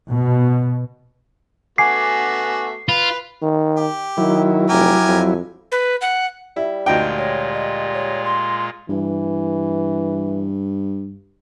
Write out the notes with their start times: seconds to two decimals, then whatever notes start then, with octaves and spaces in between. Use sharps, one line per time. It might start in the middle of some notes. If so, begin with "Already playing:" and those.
0.11 B2
1.78 A3 B3 F#4 G#5 D6 C7
2.89 F4 B4
3.42 D#3
3.77 G4
4.18 D#3 F#3 E4
4.69 F1 G4 A#4 G#5
5.06 F2
5.72 B4
6.01 F#5
6.56 G3 E4
6.86 D2 A#2 G#3 D#4 F4 G5
7.18 C#5
7.53 D#5
7.94 C#5
8.24 C6
8.90 G2 E3